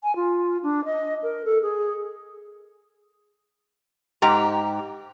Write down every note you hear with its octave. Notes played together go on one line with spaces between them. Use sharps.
G#5
F4
D4
D#5
A#4
A4
G#4
G#2 G4 A#5